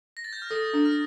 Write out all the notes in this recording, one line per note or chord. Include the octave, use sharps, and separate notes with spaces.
A#6
A6
G6
F6
A4 D#6
D4
F6